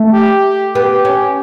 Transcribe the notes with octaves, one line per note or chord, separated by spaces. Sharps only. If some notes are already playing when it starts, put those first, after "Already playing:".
Already playing: A3
G4
B3 G4
C#4